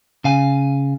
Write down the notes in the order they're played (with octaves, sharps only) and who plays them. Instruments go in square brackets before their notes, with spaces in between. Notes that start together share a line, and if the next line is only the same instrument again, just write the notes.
[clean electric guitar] C#3 F5 G#5